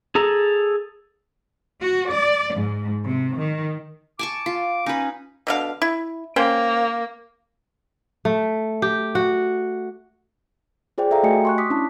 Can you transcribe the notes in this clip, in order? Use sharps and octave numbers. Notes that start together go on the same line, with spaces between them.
G#4 A4 A#5
F#4
D5
G#2
C3
D#3
G#5 A5 C#6 D6
F4
C#4 D#4 B4
B2 D3 F5
E4
A#3 C#4 C5 G5
A3
G4
F#4
F4 G#4 C5 D5 G5
A4 E5 F5 G5 A#5
A3 F#4 G4 D#5 G#5 C#7
C6 C#6 F#6
D6 D#6 B6
C#4 D4 E4 A5